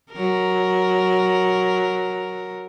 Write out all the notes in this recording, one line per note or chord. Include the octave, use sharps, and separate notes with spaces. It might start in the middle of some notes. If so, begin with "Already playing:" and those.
F#3 A#4